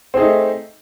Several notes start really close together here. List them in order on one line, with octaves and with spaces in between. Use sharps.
C4 G#4 D#4 A3